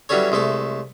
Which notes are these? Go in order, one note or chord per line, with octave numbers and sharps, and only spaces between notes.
E3 F#3 G3 C#4 A4 C#5
C2 G#3 A3 A4